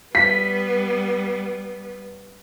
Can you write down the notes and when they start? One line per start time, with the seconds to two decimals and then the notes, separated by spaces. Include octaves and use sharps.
0.15 G3 B3 B6